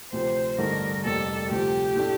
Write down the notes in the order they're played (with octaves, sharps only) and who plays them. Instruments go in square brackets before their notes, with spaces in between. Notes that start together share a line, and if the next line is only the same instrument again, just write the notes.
[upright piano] D2 C3 F3 [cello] C5
[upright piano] A1 G2 D3 [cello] A#4
[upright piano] F1 F2 C3 G3 A#3 [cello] A4
[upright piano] D2 C3 F3 [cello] G4
[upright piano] A2 A3 D4